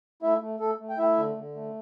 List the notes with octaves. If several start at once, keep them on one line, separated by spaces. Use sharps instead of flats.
A3 E4 E5
A3
A3 A4
A3
G5
A3 E4 E5
D3
D3
A3